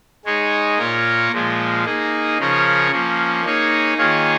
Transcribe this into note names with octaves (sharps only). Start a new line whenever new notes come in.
G#3 D#4 G#4 C#5
A#2 A#3 F4 A#4 C#5
A#2 F3 G#3 F4
A#3 D#4 G#4
C#3 F3 C#4 A#4 C#5
F3 A#3 C#4
A#3 D#4 G#4 C#5
D#3 A#3 F4 G#4 C#5